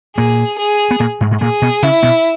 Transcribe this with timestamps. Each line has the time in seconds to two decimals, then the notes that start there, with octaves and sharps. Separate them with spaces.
0.17 A#2 A#3 G#4
0.59 G#4
0.91 B3
1.00 A#2 A#3
1.21 G#2 G#3
1.31 G#2 G#3
1.41 A#2 A#3 G#4
1.62 B2 B3
1.83 C#3 C#4 E4
2.03 B2 B3